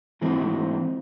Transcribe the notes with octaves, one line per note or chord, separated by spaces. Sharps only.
G#2 E3 A3 C4 D#4